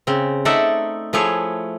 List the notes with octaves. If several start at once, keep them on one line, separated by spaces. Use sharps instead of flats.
C#3 C4
A3 D#4 A4 D5 E5 F#5
F3 A3 E4 G#4 C#5